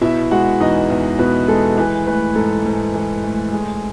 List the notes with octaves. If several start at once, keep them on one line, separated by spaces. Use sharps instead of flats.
B2 E4 E5
G#3 F#4 F#5
E2 D#4 D#5
E2
B2 B4
G#3 A4
E3 B4
A3 B4
G#2 A4
G#2
E3
A3
G#3